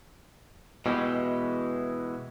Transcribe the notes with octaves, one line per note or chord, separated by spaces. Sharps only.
B2 E3 G#3 E4 G4